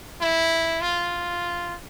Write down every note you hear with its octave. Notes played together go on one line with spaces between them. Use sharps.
E4
F4